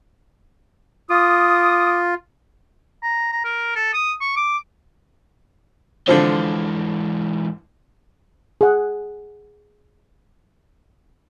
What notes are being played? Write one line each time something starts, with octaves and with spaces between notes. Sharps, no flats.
F4 D6 D#6
A#5
A#5
A#4
A4
D#6
C#6
D6
G#2 D3 E3 F3 C4
G#4 F#5